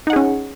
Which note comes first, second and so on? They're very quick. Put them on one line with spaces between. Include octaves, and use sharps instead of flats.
D#4 F#5 G#4 C#4